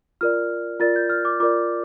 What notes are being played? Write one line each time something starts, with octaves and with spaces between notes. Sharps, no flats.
F4 A#4 D5 F6
F4 A#4 D5 A6
G6
F6
D6
F4 A#4 D5 D6